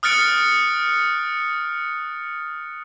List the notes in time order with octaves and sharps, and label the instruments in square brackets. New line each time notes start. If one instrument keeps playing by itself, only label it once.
[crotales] D#6 F6 F#6 A6 C#7 D7